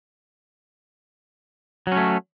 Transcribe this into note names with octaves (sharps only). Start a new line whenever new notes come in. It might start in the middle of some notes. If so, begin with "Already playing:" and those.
F#3 A3 C#4